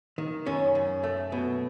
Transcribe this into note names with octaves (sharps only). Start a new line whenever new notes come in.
D#3
F#2 C#4
F#2
A3
B2